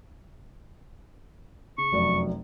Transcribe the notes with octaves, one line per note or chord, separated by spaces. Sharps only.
C#3 C#6
F1 F#2 D5